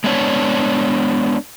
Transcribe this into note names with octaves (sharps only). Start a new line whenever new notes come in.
G#3 B3 D4 C#5